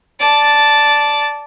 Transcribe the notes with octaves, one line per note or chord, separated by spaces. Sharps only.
D5 A5